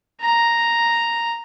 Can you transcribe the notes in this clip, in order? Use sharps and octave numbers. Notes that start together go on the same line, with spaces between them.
A#5